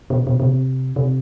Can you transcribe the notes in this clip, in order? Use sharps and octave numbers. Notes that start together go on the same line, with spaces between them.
B2
B2
B2
C3
C3